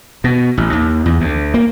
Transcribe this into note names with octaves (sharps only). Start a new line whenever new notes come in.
B2
A1
D#2
E2
D2
A#3